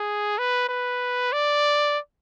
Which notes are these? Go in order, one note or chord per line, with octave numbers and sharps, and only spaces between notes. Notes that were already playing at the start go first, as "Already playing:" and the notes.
Already playing: G#4
B4
B4
D5